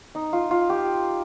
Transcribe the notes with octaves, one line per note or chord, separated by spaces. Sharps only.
D#4
F4
F4
G4